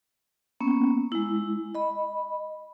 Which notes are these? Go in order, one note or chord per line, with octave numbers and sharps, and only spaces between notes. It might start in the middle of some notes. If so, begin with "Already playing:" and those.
A#3 B3 C#4
G#3 E4
D#5 B5